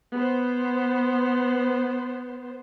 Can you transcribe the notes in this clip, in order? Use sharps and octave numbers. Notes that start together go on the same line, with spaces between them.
B3 C5